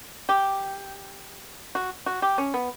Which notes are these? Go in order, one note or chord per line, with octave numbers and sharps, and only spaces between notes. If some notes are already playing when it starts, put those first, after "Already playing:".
G4
F#4
F#4
G4
C#4
B3